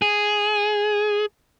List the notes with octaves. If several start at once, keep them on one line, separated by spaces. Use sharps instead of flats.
G#4